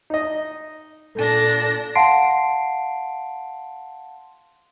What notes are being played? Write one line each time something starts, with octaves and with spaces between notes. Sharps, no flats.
D#4 D#5
A#2 D4 A4 A#6
F5 F#5 A5 C6 C7 D7